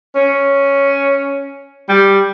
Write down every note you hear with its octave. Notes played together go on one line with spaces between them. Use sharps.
C#4
G3